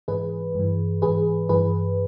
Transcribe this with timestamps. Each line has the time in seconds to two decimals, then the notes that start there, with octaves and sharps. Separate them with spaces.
0.08 G#2 E3 G#4 B4
0.55 G2 E3
1.02 G#2 E3 G#4 B4
1.49 G2 E3 G#4 B4